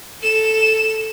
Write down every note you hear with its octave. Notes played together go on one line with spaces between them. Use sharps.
A4 E7